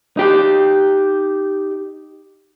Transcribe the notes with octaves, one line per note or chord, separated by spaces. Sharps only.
D#4 G4